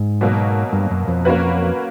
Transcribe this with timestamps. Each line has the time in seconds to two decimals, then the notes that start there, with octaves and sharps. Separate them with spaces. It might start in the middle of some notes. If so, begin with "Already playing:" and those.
Already playing: G#2
0.21 B2 F#3 A#3
0.73 G2
0.91 F#2
1.08 F2
1.25 A#3 C#4 F#4 B4